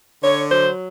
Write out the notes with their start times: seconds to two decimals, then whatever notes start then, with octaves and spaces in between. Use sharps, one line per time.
0.23 D3 C#5
0.50 F#3 C5